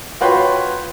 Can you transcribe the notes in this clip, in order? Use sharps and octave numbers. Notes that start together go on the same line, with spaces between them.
F4 F#4 B4 C#5 G5 C6